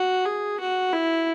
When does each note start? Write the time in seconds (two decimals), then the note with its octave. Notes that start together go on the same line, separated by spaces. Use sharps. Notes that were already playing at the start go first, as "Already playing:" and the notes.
Already playing: F#4
0.25 G#4
0.60 F#4
0.93 E4